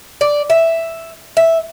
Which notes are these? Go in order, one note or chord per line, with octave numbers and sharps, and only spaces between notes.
D5
E5
E5